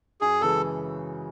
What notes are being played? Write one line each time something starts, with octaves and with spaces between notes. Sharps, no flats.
F#2 G#4
C#3 E3 G#3 A4